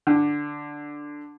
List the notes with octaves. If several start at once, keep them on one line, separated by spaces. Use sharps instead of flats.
D3